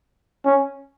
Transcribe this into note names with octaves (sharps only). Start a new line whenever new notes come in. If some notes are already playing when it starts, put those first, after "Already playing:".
C#4